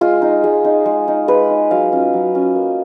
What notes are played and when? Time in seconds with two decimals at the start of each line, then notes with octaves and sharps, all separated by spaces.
0.01 G#3 F4
0.22 D#4
0.44 G#3
0.64 D#4
0.86 G#3
1.08 D#4
1.28 G#3 B4
1.50 D#4
1.71 F#3 F5
1.92 C#4 F4
2.14 F#3
2.35 C#4 F4
2.56 A#3